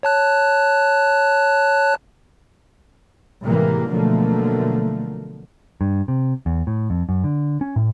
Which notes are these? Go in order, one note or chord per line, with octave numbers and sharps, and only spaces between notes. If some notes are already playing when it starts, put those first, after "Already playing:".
C#5 A5 F#6
A2 C3 E3 G3 G#3 A#3
B2 D3 F3 F#3 A3 A#3
G2
C3
E2
A2
F2
F#2
D3
C#4
A2